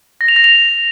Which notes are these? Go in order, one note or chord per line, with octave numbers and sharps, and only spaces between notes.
A#6
F7
A#6
F7